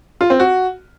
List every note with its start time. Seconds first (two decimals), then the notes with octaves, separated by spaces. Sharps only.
0.21 F4
0.30 C4
0.40 F#4